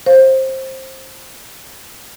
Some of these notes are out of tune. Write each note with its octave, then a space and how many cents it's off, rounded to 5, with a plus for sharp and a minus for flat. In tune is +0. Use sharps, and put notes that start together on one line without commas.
C5 +20 F5 +0